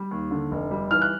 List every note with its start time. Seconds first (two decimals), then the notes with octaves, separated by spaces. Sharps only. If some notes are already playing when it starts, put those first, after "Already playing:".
Already playing: G3
0.11 D#2
0.31 D3
0.51 F1
0.71 G3
0.91 E3 F6
1.02 F#6